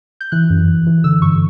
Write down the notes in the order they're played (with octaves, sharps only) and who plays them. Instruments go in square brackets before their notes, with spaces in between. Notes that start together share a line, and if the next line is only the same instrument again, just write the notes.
[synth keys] G6
E3 F#6
F#2
F#2
E3
D3 E6
G2 C#6